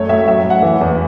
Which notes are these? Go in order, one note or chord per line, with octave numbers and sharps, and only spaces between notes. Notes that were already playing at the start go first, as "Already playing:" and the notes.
Already playing: F#2 A3 C#5
A2 E5
F#3 E5
A2
F#5
E3
E2